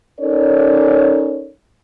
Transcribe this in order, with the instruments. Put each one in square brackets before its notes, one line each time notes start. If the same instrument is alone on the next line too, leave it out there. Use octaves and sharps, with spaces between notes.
[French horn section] C#4 D#4 A4 A#4 C#5 D5